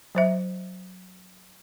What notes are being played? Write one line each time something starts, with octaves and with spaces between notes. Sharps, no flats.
F#3 C5 E5